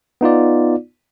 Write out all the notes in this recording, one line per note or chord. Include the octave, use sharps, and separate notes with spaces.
B3 D#4 F4 D5